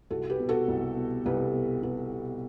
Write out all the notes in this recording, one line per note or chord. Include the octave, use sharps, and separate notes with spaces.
C2 F#4 A4
G4 B4
B2
F#4 A4
C2
B2
C2 G4 B4
B2
C2 G4 B4
B2